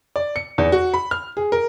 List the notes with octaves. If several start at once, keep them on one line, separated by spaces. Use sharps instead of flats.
D5
C#7
E2
F#4
B5
F6
G#4
A#4